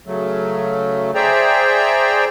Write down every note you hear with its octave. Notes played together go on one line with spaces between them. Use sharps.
C#3 F#3 A3
G#4 C5 D5 E5 G5 A#5